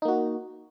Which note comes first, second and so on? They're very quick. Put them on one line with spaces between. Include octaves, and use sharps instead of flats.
D#4 A#3 F#4